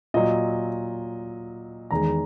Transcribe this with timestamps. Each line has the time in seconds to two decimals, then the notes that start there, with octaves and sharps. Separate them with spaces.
0.14 A#2 F#3 D#5
1.91 E2 D#3 G#3 A#5